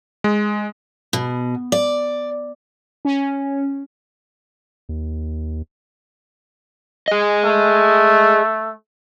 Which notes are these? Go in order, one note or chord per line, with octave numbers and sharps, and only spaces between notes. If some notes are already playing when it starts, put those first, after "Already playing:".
G#3
B2
D5
C#4
D#2
G#4 D#5
A3